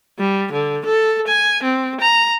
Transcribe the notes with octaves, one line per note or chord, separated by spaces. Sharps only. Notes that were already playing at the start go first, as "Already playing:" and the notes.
G3
D3
A4
G#5
C4
A#5